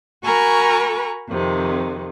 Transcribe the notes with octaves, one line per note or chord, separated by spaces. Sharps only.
F#4 A#4 G#5 A#5 B5 C#6
F2 C3 D#3